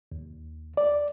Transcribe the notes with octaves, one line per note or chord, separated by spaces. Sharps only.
D#2
D5